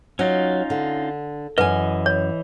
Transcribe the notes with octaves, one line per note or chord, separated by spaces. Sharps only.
F#3 C#4 D#4 F4
D3
F#2 E3 B4 D#5 G#5
C#5